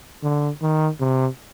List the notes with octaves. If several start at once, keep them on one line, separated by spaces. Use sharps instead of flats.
D3
D#3
C3